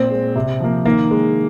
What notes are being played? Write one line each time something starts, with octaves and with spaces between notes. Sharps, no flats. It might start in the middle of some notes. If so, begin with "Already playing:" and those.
Already playing: A#2 C4
G#3
C3
F3 A#3
D#3 A#3
G#3